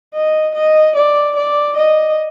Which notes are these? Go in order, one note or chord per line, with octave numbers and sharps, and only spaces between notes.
D#5
D#5
D5
D5
D#5